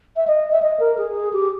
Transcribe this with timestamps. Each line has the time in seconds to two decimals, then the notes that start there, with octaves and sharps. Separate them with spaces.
0.16 E5
0.27 D#5
0.52 E5
0.62 D#5
0.80 A#4
0.98 G#4
1.33 G4